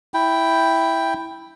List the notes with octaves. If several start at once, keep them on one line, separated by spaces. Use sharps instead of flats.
E4 G5